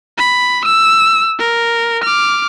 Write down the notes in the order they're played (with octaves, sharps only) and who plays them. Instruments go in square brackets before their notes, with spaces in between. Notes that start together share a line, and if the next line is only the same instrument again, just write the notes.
[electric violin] B5
E6
A#4
D6 F6